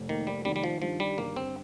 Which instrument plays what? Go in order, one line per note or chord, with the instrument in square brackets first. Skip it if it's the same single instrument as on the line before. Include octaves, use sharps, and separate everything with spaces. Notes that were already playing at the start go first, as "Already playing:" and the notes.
Already playing: [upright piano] F1
[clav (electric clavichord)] D#3 [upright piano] A#3
[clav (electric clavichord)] G3
[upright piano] D#3 [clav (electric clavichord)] G3
[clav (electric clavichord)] G3
F3
[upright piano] G2 [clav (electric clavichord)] F3
[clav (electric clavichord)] G3
[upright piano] G1 [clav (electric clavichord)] A#3
[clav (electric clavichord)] C4